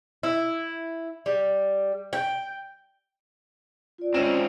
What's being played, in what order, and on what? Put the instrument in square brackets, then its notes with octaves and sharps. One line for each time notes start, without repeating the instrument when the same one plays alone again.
[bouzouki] E4
G3
G5
[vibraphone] F4 D5
[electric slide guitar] G#2 C4 [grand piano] C#4